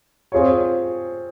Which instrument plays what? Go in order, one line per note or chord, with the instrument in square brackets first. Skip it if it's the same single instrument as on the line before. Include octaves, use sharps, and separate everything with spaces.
[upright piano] C4 F4 G#4 C#5